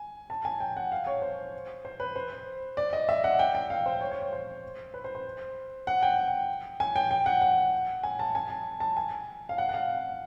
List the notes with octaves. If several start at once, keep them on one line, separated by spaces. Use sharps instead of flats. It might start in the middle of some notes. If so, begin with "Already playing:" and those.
Already playing: G#5
A5
G#5
G5
F#5
F5
C#5
C5
C5
B4
C5
D5
D#5
E5
F#5
G5
G5
F5
C5
C#5
C#5
C#5
C5
B4
C5
C5
F#5
G5
G#5
G5
G5
F#5
F#5
G#5
A5
G#5
A5
A5
G#5
F5
F#5
F#5
F5